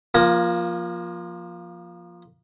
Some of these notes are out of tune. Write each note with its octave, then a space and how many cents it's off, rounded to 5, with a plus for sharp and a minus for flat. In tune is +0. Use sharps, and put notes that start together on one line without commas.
F3 +0 A#3 +25 A#5 +0